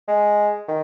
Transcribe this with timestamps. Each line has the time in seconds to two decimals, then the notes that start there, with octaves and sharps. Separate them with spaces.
0.08 G#3
0.68 D#3